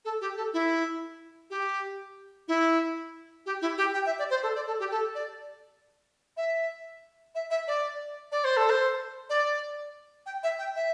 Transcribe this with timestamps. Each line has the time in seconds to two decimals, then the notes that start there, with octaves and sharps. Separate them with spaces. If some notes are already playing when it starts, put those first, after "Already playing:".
0.05 A4
0.21 G4
0.37 A4
0.54 E4
1.50 G4
2.48 E4
3.46 G4
3.62 E4
3.78 G4
3.94 G5
4.06 E5
4.19 D5
4.30 C5
4.43 A4
4.55 D5
4.67 A4
4.80 G4
4.91 A4
5.15 D5
6.37 E5
7.35 E5
7.50 E5
7.68 D5
8.32 D5
8.44 C5
8.57 A4
8.70 C5
9.30 D5
10.26 G5
10.43 E5
10.59 G5
10.76 E5